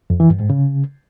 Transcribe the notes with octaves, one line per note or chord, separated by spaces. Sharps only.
F2
E3
G2
G#2
C#3